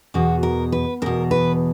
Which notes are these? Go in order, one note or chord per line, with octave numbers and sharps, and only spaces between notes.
E2 B2 F#4
A#4
B4
E2 B2 A#4
B4